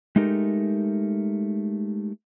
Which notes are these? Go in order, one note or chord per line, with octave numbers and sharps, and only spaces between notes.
G#3 A3 D#4 G4 A#4